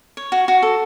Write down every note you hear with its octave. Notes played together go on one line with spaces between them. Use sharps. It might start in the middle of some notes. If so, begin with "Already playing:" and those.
C#5
F#4
F#4
A4